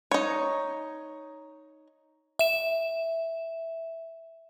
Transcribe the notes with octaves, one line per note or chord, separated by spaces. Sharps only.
D#4 C#5
E5 E7